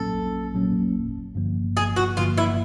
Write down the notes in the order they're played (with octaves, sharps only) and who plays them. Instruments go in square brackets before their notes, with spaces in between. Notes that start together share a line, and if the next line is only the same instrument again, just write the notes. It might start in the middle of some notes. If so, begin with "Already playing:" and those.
Already playing: [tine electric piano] A#1 A#2 F#3 A#3 C#4 [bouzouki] A4
[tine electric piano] A#1
A#2 F#3 A#3 C#4
G1
G2 D3 F3 A#3
[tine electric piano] G1 [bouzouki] G#4
[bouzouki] F#4
[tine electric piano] G2 D3 F3 A#3 [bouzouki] F4
[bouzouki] E4